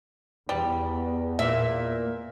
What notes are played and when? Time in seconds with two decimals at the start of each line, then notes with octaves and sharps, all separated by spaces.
0.49 E2 G3
1.39 A#2 E3 E5